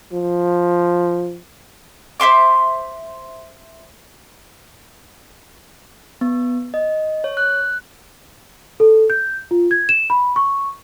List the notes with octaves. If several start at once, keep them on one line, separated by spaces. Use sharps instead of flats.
F3
C5 E5 C6 D6
B3
D#5
C#5
F#6
A4
G6
F4
G#6
E7
B5
C#6